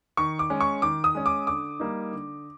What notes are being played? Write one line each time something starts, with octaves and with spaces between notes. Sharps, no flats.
D#3 C#6
D6
G#3 C#4
C#6
D#3 D6
D#6
G#3 C#4
D6
D3 D6
G3 A#3 D#4
D3